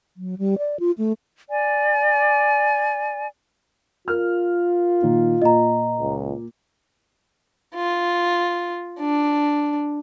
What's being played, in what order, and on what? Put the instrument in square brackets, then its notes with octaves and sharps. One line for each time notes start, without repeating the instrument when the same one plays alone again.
[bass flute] F#3
G3
D5
F4
A3
[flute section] D5 G#5
[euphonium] F4 [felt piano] A#4 F6
[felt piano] A#2 D#3
[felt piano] A#2 [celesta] D#5 A#5
[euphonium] C#2
[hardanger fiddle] F4
D4